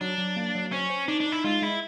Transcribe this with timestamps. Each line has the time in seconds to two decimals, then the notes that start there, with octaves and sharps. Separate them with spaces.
0.01 F#3 D4
0.18 F#3
0.36 A#3
0.55 F#3
0.72 C#4 C5
0.90 C5
1.08 D4 D#4
1.20 D4
1.26 D#4
1.32 E4
1.44 G#3 F4
1.62 G#3 E4